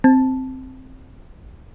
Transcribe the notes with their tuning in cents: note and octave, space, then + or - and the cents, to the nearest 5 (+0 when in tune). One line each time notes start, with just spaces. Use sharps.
C4 +0 A5 +0